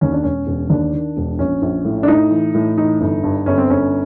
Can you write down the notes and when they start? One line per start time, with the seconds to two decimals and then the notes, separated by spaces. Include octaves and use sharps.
0.01 D#2 C#4
0.12 D4
0.23 E1 C#4
0.47 E1
0.70 D#2 D4
0.93 D#3
1.17 E1
1.39 A#1 C#4
1.62 A#1
1.85 A2
2.03 D4
2.08 A2 D#4
2.31 E3
2.55 A2
2.77 E3 D#4
3.01 G1
3.23 G2
3.46 G1 C#4
3.58 C4
3.69 G1 C#4